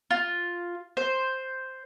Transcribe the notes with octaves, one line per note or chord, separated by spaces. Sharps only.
F4
C5